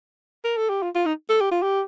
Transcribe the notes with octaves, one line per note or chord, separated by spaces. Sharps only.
A#4
A4
G4
F4
F4
D#4
A4
G4
F4
G4